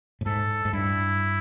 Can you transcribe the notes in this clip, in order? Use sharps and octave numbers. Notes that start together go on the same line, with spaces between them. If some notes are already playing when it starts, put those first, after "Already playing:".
A2
G#2 A4
G#2
G2 E4